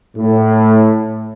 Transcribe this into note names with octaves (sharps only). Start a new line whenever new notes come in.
A2